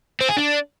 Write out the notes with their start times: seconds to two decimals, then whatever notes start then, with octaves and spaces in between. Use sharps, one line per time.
0.21 C4
0.29 G#4
0.37 D4